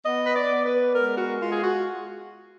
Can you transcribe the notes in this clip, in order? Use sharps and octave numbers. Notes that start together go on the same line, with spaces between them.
B3 D#5
B4
D5
B3
B4
G#3 A#4
F#4
G#3 F4
G#4
F#4